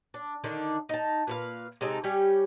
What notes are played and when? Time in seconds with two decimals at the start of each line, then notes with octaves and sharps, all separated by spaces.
0.14 D4
0.44 D3 D#3 D4 D#4
0.89 D#4 A5
1.27 A#2 B4 F5
1.81 C3 G#3 D#4 A4
2.03 G3 C#4 G4 G#5